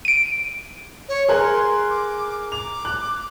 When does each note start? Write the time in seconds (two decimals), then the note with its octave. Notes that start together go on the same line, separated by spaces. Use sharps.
0.05 D7 D#7
1.09 C#5
1.28 G#4 A#4 C6 F#6
1.90 D6
2.52 D6 F7
2.85 F#6